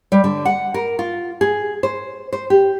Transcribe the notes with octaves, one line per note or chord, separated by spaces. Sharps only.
G3
D3
F#5
A#4
F4
G#4
C5
C5
G4